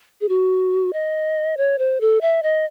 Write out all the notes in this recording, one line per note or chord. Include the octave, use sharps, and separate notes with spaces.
G#4
F#4
D#5
C#5
C5
A4
E5
D#5